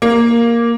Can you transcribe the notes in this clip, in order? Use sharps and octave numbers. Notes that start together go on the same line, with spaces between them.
A#3